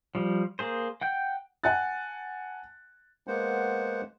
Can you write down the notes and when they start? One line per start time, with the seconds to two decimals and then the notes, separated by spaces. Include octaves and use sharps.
0.15 F3 G3
0.59 A#3 G#4 C5
1.01 F#5 G5 G6
1.64 F#5 G#5 A5 F#6 A6
3.27 G#3 A#3 B3 C5 F#5